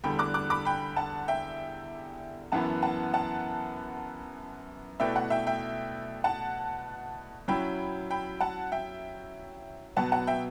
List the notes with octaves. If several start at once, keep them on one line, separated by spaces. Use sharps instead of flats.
E2 D3 G3 G5 B5
D6 F#6
D6 F#6
B5 D6
G5 B5
F#5 A5
E5 G5
F#2 E3 B3 F#5 A5
F#5 A5
F#5 A5
B2 A3 E4 B4 D5 E5 G5
F#5
E5 G5
E5 G5
F#5 A5
F#3 C#4 E4 G5 B5
G5 B5
F#5 A5
E5 G5
B2 F#3 B3 F#5 A5
F#5 A5
E5 G5